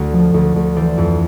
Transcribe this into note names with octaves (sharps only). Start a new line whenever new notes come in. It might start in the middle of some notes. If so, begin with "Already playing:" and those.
Already playing: D2
F3
D2
D2
E3 C5 D5
F2